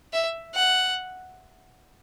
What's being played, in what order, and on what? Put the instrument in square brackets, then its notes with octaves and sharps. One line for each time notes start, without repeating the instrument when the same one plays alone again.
[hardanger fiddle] E5
F#5